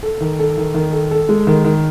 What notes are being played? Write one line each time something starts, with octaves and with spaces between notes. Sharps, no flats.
A4
D#3
A4
D#3
D#3
A4
A4
G#3
D#3
D#3